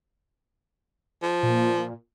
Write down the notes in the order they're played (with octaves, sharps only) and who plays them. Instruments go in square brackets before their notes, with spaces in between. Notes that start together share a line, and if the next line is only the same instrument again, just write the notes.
[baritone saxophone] F3
[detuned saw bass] A#2